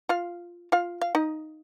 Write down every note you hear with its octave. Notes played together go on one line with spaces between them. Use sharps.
F4 F5
F4 F5
F5
D#4 D#5